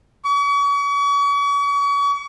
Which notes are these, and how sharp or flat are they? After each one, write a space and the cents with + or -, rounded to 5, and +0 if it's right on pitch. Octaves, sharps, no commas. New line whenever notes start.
C#6 +40